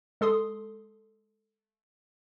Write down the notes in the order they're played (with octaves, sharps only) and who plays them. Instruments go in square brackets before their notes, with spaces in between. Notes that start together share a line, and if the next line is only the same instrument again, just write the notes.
[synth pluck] G#3 A4 C6 D#6